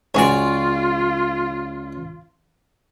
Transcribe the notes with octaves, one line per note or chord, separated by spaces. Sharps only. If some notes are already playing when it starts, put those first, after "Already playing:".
C#2 F4 F#4 G#4 C#5 D5